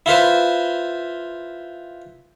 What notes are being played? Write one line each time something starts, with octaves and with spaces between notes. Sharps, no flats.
E4 F4 B4 C5